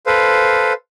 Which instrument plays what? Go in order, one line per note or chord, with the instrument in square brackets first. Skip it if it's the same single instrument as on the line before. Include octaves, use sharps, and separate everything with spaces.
[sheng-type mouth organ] A4 B4 C5 F5